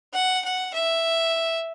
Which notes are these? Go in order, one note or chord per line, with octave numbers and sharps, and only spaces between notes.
F#5
F#5
E5